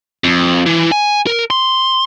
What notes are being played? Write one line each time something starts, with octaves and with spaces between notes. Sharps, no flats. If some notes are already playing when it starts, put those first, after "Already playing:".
F2
E3
G#5
A#4
C6